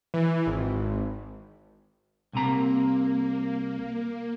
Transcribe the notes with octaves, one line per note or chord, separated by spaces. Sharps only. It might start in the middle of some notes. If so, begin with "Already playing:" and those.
E3
G#1
C2 C3 A#3 A#5